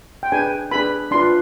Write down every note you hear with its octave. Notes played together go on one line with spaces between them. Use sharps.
G5
D4 G#4 B4 G#5
D4 G#4 B4 B5
D4 F4 B4 C6